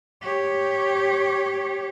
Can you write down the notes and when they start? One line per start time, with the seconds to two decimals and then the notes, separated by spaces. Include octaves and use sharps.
0.22 G4 C#5